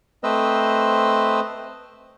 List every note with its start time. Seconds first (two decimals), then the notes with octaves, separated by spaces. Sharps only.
0.23 A3 C4 B4 C5 D#5 E6